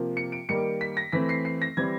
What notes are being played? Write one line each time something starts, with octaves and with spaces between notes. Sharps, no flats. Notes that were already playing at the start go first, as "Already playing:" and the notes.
Already playing: C3 F3 A#3
C#7
D7
D#3 G3 A#3 C#7
B6
A#6
E3 A3 C4 B6
C7
C7
A#6
E3 G3 C4 G#6